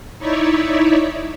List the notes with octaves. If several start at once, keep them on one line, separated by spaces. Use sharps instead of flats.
D#4 E4 C#5 D5 E5